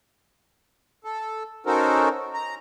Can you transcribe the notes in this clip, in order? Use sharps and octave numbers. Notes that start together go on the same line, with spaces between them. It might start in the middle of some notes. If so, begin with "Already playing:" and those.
A4
C#4 D#4 F#4 A4 A#4 C5
A#5